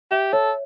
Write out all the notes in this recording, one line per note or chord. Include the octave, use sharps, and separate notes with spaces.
G4 E5
A4 C#5